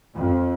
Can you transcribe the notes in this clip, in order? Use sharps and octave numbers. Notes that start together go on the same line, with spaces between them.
F2